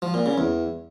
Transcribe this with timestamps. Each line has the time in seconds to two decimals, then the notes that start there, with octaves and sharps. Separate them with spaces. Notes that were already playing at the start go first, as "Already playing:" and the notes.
0.02 F3
0.14 A#2
0.26 C#3
0.38 E2